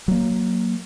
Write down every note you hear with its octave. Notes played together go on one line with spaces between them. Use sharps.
F#3 A#3